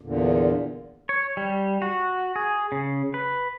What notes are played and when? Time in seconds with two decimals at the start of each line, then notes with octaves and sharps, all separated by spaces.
0.01 E2 A#2 D3
1.09 C#5
1.37 G3
1.82 F#4
2.36 G#4
2.72 C#3
3.14 B4